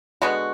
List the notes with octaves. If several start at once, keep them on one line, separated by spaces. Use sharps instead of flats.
D3 G#3 B3 F#4